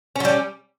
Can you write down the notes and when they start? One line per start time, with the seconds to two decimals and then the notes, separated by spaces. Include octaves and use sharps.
0.16 C#4
0.20 F#3
0.25 G3